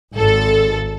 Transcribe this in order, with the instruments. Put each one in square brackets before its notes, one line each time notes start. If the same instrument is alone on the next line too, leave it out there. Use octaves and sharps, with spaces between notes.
[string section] G#1 A4